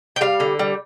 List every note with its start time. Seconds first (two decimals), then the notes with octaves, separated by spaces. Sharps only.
0.16 G5
0.21 G3 F5
0.40 D3
0.59 G3